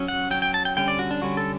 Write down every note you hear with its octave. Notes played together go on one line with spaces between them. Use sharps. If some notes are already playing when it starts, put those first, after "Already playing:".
Already playing: F#3 C#4
F#5
F#3 C#4 G5
G5
A5
G5
D3 G3 C#4 G5
D5
F#4
D4
D3 G3 C#4 F#4
A4